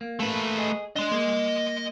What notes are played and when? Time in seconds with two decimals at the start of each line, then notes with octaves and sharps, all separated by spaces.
0.01 A#3
0.19 A3 B4
0.57 G#4 D#5
0.96 D4 D#5 C6
1.11 A#3